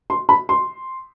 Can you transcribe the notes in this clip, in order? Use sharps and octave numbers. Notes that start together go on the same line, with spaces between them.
C6
B5
C6